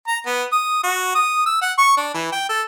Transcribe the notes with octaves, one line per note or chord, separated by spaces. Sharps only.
A#5
B3
D#6
F#4
D#6
E6
F#5
C#6
D4
E3
G5
A4